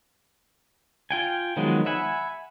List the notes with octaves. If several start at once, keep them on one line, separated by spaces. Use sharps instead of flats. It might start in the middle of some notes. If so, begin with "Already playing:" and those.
F4 G5 G#5
D#3 F3 F#3 G#3 B3
E5 F#5 G#5 B5